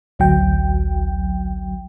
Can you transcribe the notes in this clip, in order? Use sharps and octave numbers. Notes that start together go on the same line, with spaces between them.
A1 D2 F#3 G5